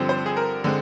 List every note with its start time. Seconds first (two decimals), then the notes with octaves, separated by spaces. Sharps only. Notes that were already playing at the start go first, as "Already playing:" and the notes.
Already playing: G2 D3 F3 C4
0.09 C5
0.26 G#4
0.37 A#4
0.64 D3 G#3 C4